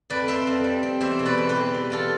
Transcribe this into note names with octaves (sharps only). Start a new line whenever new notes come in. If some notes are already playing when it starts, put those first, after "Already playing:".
F2 B4 D5
C4 C5 E5
F2
G3
C4
E2 C5 E5
B2
B4 D5
E2
G4 B4
E2
E2
E2 F4 A4